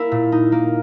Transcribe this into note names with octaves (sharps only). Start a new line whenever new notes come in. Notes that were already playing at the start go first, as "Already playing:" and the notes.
Already playing: A#3 E4 A#4
A#2
D#4
A#3